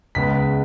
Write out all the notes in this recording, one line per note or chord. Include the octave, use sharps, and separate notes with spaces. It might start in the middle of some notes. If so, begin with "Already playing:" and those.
C#2 C#3 G#3 B3 B6